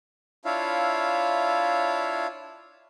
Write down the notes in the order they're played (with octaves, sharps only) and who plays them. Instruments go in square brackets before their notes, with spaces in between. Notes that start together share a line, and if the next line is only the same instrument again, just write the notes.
[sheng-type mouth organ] D4 E4 F4 C#5 E5 F5